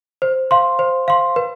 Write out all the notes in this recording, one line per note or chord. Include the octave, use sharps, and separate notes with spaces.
C5
F5 C6
C5
F5 C6
B4